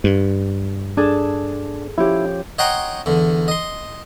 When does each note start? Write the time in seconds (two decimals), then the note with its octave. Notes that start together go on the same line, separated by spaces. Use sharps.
0.04 G2
0.97 D4 G#4 A4 A5
1.98 F3 C#4 E4 G4
2.58 C#5 D#5 F#5 G5 A#5 C6
3.06 E2 D3
3.48 D#5 C6